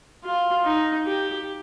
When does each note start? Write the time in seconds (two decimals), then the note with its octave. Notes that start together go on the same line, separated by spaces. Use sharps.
0.24 F4
0.65 D#4
1.06 G4